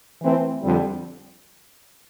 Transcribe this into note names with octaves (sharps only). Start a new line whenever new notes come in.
E3 A3 C4
F2 D3 G3